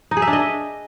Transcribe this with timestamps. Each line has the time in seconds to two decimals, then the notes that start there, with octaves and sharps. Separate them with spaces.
0.11 D#4
0.17 G#4
0.22 E5
0.27 D4
0.33 D#5